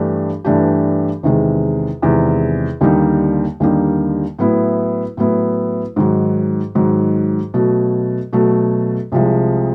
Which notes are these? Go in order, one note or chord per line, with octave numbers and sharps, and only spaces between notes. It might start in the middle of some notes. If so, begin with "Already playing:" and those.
Already playing: G2 E3 A3 D4 G4
G2 E3 A3 D4 G4
E2 C3 D#3 G#3
E2 C3 D#3 G#3
D#2 D3 G3 A#3 D#4
D#2 D3 G3 A#3 D#4
A2 F#3 B3 E4
A2 F#3 B3 E4
G#2 D#3 F#3
G#2 D#3 F#3
B2 F#3 A3
B2 F#3 A3
C2 C3 F3 G#3